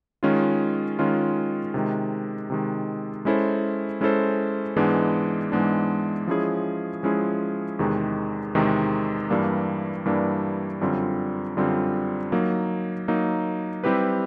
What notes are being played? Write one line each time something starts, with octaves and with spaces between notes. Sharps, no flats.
D#3 G#3 C#4 F4
D#3 G#3 C#4 F4
C3 D#3 G#3
C3 D#3 G#3
G#3 C#4 E4 A4 C5
G#3 C#4 E4 A4 C5
G#2 E3 G#3 B3 D4
G#2 E3 G#3 B3 D4
F3 G#3 C#4 E4 G#4
F3 G#3 C#4 E4 G#4
E2 C3 D#3 G#3
E2 C3 D#3 G#3
G2 E3 G3 A#3 D4
G2 E3 G3 A#3 D4
F#2 D3 G3 C4 F4
F#2 D3 G3 C4 F4
F#3 A#3 D#4
F#3 A#3 D#4
G3 C4 E4 G4 B4